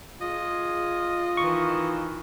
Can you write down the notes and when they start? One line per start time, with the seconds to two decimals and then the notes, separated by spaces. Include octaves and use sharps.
0.21 F4 G#4 D#5
1.37 D#3 E3 C#6